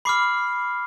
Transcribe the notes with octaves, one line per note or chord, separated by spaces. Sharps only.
B5 D6 F6 C7